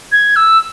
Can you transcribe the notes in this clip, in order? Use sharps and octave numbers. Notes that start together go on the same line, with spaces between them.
G#6
E6